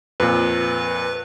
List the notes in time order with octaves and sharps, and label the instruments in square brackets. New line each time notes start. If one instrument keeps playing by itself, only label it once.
[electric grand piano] F2 A#2 [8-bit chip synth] B4